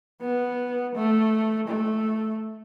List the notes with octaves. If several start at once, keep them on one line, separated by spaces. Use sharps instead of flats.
B3
A3
A3